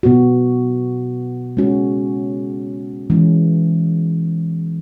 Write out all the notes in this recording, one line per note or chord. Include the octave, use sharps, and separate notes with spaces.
B2 B3 F#4
G#3 C#4 F#4
E3 G#3 C#4